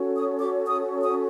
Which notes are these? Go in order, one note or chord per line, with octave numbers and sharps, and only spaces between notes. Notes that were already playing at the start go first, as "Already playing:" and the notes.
Already playing: C#4 F#4 A4 C#5
D#6
D6
D#6
D#6